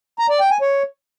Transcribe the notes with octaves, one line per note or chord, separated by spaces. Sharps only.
A#5
D5
G5
G#5
C#5